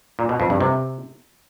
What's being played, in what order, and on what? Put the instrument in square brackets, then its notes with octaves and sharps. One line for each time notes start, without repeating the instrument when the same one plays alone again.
[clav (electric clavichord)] A#2
B2
F2
G2
C3